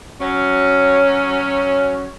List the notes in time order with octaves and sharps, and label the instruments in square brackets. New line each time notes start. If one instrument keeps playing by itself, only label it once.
[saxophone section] F#3 C#4